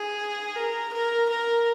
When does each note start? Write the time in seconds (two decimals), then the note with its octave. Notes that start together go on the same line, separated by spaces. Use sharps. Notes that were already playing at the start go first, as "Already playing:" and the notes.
Already playing: G#4
0.56 A#4
0.93 A#4
1.29 A#4